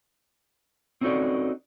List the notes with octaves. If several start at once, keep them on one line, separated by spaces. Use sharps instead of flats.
C4 C#4 D#4 F#4 A4 D5